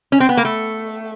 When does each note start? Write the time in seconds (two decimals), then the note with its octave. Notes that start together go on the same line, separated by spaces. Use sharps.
0.12 C#4
0.20 C4
0.29 B3
0.37 A#3
0.45 A3